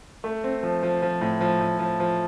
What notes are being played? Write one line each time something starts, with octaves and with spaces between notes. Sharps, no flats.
A3
C4
F3
F3
F3
A2
F3
A2
F3
F3